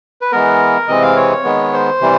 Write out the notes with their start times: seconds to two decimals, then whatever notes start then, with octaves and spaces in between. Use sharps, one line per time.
0.21 B4
0.32 E3 G#3 B3 A#4
0.88 C3 E3 G#3 C4 D#5
1.03 F5
1.16 C#5
1.44 D#3 G#3 B3
1.73 C5
2.01 C3 E3 G3